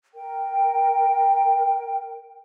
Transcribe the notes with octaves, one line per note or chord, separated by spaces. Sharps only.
A#4 G5